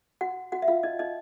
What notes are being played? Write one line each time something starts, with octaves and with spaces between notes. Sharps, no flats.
F#4 F#5
F#4 F#5
E5
F4 F5
D#4 D#5
D#4 D#5